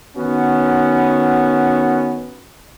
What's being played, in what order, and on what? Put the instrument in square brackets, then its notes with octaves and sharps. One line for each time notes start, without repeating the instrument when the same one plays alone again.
[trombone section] D#3 B3 C#4 F#4